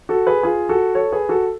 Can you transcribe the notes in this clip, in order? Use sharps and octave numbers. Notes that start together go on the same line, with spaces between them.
F#4 A4
G#4 B4
F4 G#4
F#4 A4
A4 C#5
G#4 B4
F#4 A4